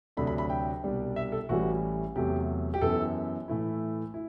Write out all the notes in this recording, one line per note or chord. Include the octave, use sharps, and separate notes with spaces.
D2 C3 F#3 A3 D4 B5
B5
B5
G5
C2 B2 G3 D4
E5
A4
A1 A2 E3 G3 F#4
E2 C3 F#3 A3 G4
G4
F#2 E3 B3 E4 A4
A2 E3 A3 E4
E4